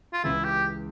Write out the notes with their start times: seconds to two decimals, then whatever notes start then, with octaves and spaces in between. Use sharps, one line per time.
0.13 F4
0.24 C#2 C#3 E3 E4
0.44 G4